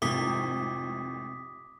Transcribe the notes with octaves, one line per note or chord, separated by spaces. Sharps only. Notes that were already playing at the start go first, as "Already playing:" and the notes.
G#1 F2 A2 C3 F4 D6 D#6 B6